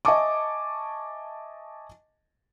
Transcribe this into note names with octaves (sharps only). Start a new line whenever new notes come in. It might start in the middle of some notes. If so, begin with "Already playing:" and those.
D#5 E5 G#5 A5 C#6 D6